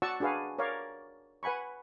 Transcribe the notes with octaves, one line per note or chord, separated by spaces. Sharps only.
F#4 D5 F#5 A5 C#6 E6
D4 F#4 G#4 B4 F5
A#4 C#5 D5 F5
B4 F#5 G#5 B5 C#6